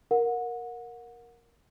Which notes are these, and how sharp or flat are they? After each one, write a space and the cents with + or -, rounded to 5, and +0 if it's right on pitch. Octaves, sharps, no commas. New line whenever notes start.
A#4 +0 F#5 -30